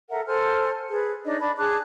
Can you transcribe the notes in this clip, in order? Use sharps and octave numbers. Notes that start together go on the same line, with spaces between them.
A4 A#4 E5 F#5
A4 C5 G#5 F6
G#4 B4
D4 D#4 C#5 D#5
D4 A5 B5
G#4 A5 D6 F#6